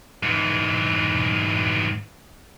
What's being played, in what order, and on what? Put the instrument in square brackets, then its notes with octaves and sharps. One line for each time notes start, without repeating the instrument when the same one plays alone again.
[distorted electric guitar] G#2 E3